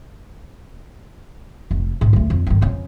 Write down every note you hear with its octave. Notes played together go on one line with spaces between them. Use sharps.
F1
G#2
D2 A3
F2
G1 D#3
F2 C#3